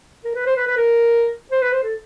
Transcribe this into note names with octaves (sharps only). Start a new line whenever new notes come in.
A#4
B4
C5
B4
B4
A#4
C5
B4
C5
A4